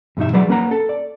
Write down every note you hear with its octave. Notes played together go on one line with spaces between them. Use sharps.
E2 G2 B2 D#4 E5
F#3 G#4 B4 D5 F#5 B5
A#3 C#4 A#4 B4 F#5 A#5
A4
D5